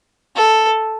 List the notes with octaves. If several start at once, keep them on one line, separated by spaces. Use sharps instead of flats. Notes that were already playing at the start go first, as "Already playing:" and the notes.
A4